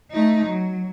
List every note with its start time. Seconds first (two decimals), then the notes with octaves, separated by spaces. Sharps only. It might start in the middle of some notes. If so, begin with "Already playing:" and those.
0.11 A3 D#4
0.45 F#3